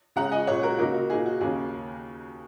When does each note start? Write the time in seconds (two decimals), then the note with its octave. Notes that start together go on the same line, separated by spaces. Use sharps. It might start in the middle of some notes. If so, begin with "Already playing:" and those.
0.16 C#3 G#3 C#4 F#5 A#5
0.32 D#5 G#5
0.47 A#2 G#3 C#4 C#5 F#5
0.63 F#4 A#4
0.78 C#2 C#3 A#3 D#4 F#4 A#4
0.94 F#4
1.10 A#2 A#3 D#4 G#4
1.26 F#4
1.41 D#2 C#3 A#3 C#4 G#4